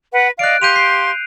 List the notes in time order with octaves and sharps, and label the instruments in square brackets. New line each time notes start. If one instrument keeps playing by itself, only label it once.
[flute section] B4 F#5
[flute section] D5 D#5 F5 [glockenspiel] F#6 D7
[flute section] G4 F5 C6 [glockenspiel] G6 D#7 F7
[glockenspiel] C7